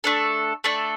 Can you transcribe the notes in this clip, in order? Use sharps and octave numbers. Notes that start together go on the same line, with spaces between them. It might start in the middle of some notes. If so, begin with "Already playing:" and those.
A3 D4 A4
A3 D4 A4